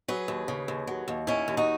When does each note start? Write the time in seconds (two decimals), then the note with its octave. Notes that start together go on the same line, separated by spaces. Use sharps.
0.08 F#3 G#4 B4
0.28 D#2
0.48 C#3
0.68 D#2
0.87 F#3
1.08 D#2
1.27 D#3 C#4 E4
1.48 D#2
1.57 D#4 F#4